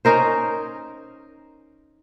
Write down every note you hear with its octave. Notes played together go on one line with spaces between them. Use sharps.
C#4 D#4 A#4 C5